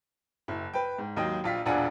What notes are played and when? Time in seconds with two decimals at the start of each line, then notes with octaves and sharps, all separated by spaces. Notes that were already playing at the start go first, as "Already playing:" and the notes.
0.48 F#1 E4
0.73 B4 G5
0.98 G#2
1.17 D#2 D#3 F#3 D#5 G5
1.44 A#1 F4 B6
1.66 E1 A#1 D4 F4 F#5 G#5